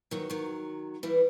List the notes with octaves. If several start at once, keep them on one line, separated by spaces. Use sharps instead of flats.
D#3 F#3
D#3 F#3
E3 G3